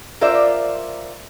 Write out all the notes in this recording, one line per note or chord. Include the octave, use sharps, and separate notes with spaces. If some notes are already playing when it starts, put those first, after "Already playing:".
F4 A#4 C5 D5 E5